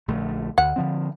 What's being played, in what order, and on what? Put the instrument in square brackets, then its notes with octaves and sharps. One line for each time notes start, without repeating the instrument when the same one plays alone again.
[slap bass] A#1 D3 A3
[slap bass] D2 [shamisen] F#5
[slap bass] D3 F3 C4